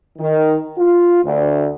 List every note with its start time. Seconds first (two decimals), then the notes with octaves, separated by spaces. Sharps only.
0.18 D#3
0.76 F4
1.23 D2